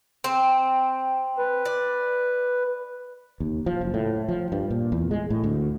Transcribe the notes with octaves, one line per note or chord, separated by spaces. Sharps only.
C4
B4
D5
D#2
F3
F#1
A2
F3
G2
A#2
E2
G#3
A2
D2